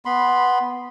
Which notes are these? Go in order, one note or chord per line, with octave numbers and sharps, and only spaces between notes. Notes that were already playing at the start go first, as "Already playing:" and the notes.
B3 B5 C6